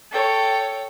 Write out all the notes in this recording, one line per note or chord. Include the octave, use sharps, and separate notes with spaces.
A4 C#5 G5